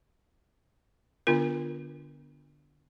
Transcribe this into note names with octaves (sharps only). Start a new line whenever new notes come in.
D3 B3 D4 F4 A#4